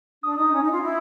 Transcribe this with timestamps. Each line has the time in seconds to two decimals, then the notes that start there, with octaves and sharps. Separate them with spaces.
0.23 D4 D#6
0.37 D#4 D#6
0.53 C#4
0.63 D#4
0.72 F4
0.82 E4